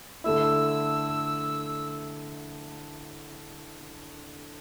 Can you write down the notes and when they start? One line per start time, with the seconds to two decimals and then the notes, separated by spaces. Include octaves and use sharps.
0.24 D3 A3 E4 E6